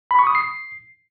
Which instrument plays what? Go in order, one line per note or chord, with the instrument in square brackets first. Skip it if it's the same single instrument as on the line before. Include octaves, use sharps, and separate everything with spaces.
[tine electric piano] B5
C#6
D#6
C7